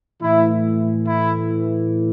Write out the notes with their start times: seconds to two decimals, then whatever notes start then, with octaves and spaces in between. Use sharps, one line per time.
0.21 A2 E3 E4
1.06 E4